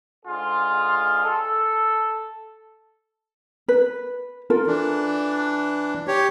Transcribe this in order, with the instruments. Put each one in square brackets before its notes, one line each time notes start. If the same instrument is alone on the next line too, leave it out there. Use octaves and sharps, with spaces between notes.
[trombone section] G#2 D3 F4 G#4
A4
[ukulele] B4
F4 A4 A#4
[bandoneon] E3 D4
G4 C#5